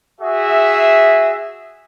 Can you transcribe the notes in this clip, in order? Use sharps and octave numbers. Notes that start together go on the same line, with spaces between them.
F#4 G#4 E5